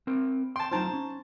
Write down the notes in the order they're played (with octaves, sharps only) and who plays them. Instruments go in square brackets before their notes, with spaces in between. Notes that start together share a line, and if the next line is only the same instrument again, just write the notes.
[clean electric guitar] C4 A#4
[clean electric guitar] G5 [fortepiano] A5 C6
[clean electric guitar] F#3 D#4 F4 [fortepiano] C5 A5 A#5
[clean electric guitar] C#4